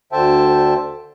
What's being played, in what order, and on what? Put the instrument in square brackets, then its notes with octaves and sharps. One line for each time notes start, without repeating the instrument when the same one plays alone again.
[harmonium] D2 D3 C5 E5 G5 A5